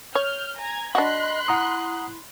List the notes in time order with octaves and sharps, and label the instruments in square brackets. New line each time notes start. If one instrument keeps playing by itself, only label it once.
[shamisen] C#5 [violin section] F6 G6
[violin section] G#5 A#5 G#6
[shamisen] D4 F#4 [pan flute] D#5 [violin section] B5 C6 F#6
[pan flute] E4 [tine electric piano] F#5 A#5 D#6